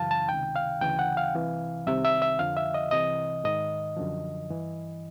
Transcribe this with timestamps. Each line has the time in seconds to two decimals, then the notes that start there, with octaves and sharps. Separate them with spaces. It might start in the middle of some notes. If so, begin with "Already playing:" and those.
Already playing: F#2 C#3 E3 F5 A5
0.11 A5
0.29 C#2 C3 D#3 G5
0.56 F5
0.81 D2 C#3 E3 G5
0.99 F#5
1.17 F5
1.35 C2 C3 E3
1.87 C2 C3 D#3 E5
2.05 E5
2.22 E5
2.39 F2 D3 F3 F5
2.57 E5
2.74 D#5
2.91 C2 C3 E3 D#5
3.44 G#2 D#3 D#5
3.97 F#2 D3 F3
4.50 G2 E3